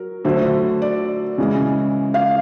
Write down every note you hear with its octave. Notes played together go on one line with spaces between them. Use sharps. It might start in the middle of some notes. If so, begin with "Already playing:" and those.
Already playing: F#3 A#4
D3 F#3 A3 C5
D5
C#3 E3 G#3
F5